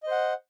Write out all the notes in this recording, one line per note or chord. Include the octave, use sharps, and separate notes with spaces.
C5 D#5 F#5